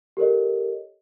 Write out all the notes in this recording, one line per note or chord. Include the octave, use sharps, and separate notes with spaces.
G4 A4 A#4 C#5 D#5